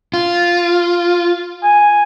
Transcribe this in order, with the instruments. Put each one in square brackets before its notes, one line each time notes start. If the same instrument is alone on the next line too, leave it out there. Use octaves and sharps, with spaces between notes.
[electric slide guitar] F4
[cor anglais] G#5